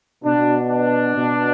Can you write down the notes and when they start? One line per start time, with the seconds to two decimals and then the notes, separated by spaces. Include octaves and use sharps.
0.24 B2 D4
0.70 D4
1.16 B2